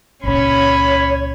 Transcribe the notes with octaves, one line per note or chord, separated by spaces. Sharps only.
C#2 A#2 C#4 C#5 B5